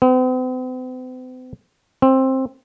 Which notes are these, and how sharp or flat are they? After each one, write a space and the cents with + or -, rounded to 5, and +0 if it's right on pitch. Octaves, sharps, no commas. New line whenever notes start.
C4 -45
C4 +15